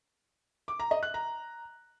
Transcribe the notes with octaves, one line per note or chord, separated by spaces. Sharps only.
D6
A#5
D#5
F#6
A#5